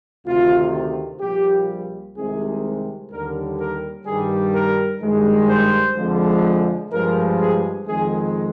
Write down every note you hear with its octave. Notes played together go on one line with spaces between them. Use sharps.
D2 C3 D#3 F4
A#1 A#2 G3 G4
C2 C3 D#3 G#3 G#4
D#2 D3 G3 A#4
A#4
G2 D#3 G3 G#4
A#4
G2 D#3 G#3
C5
F2 D3 F3 G#3
G2 F3 G#3 A#4
G#4
F2 D#3 G#3 G#4